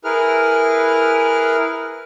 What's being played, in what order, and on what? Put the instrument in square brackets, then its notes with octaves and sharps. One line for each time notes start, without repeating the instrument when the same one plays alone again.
[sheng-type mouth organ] E4 G#4 A#4 B4 F6